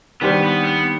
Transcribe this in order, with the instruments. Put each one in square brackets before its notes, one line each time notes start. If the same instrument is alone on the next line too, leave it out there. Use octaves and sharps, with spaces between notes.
[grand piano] D#3 G3 D4 G4 C5 [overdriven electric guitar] B3
[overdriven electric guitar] B3
B3